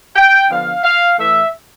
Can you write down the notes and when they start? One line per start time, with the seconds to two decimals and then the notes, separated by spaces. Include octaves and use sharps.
0.16 G5
0.51 D3 F3 B3 D4 F5
0.84 F5
1.18 A2 E3 A3 E5